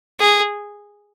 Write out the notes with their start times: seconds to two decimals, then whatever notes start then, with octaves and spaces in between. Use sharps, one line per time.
0.20 G#4